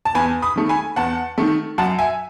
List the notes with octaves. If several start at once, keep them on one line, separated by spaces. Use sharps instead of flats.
A5
E2 G#5 B5
B5 D#6
D#3 A3
G#5 B5
E2 F#5 A5
D#3 A3
F#2 F#5 A5
E5 G#5